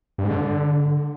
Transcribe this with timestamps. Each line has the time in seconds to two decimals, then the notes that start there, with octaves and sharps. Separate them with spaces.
0.18 G2
0.24 G#2
0.31 D3